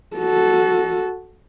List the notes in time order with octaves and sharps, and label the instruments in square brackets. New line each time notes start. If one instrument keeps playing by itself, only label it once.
[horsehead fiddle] F#4 A4